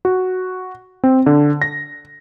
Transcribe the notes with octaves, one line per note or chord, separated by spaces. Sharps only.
F#4
C4
D3
A#6